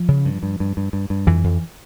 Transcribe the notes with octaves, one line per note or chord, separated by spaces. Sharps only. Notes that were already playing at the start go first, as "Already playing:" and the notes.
Already playing: F3
C#3
G2
G2
G2
G2
G2
G2
F2 E3
F2